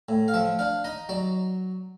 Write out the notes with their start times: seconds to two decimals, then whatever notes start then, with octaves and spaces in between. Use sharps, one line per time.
0.09 A2
0.28 F5
0.34 F3 E5
0.59 D4 F5
0.84 D#4 D#5
1.09 F#3 D5